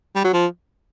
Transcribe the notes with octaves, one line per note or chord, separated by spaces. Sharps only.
G3
F#3
F3